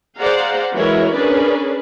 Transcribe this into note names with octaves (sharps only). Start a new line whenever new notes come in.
G#4 C5 D5 F5 F#5 A#5
E3 F#3 G#3 E4 A#4 C#5
C#4 D4 G#4 A#4 B4 D5